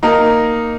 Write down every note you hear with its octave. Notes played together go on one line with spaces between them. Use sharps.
A#3 D#4 A#4